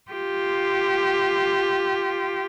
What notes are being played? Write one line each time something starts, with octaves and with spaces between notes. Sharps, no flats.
F4 G4